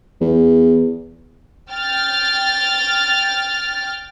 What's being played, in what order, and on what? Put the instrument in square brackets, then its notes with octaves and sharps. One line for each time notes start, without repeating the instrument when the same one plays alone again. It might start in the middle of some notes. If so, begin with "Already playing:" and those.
[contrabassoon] E2
[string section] G5 F6 A6